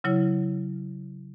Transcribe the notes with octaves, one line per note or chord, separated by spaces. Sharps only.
C#3 F#3 E4 C#5